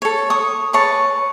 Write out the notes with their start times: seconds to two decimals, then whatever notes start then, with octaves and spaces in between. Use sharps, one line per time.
0.02 A4 C#5
0.30 C#6 D#6
0.73 G#4 B4 C#5 A5